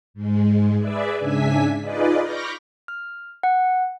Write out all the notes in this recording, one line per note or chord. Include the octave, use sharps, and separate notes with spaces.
G#2 G#3
G#4 B4 D5 E5
G#2 C#3 D4 E5 G#5 B6
D#4 F4 G#4 B4 D5 D#5
B5 C#6 D6 F6 G6 A#6
F6
F#5